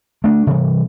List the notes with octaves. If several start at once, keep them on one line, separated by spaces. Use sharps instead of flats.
A3 D4
C3 E3 G3